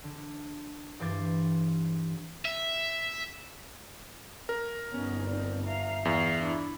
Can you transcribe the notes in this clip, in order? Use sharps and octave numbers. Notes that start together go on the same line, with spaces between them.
D3
G2 E3 C5 D6 G#6 A6
E5
A#4
G1 B3 C#4 D#4
C4 D#4 D5
E5 F5 A#5
E2 F5
D4 E4